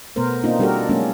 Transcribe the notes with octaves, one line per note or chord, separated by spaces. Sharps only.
B2 A3 B3 A#4 C5
A#3 C4 D4 D#4 F4
G3 D4 F#4 G4 A4 A#4
F#3 G#3 A#3 C#4 D4